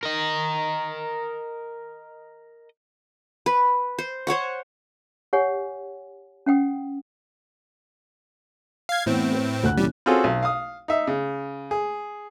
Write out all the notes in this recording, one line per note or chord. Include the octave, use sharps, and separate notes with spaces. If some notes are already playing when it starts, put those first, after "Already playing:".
A#4 D#5
B4
C5
C5 C#5 F#5 C#6
G4 C#5 F#5 G#5
C#4 F#5 G5 D#6
F5 G#6
A2 E3 B3 C4
B4
D2 F#5 F#6
D#1 E3 G3 C#4
C4 C#4 F4 F#4 G#4 A4
B1
F5 D#6
D#4 E5
C#3
G#4